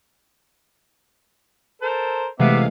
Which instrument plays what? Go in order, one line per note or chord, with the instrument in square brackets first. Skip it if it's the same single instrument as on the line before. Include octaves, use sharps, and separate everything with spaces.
[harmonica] A4 A#4 C5
[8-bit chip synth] C3 F5 [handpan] E3 G#3 A3 [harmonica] B3 E5 D6